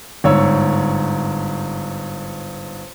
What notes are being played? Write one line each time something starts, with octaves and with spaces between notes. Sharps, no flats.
G1 G#2 C#5 E6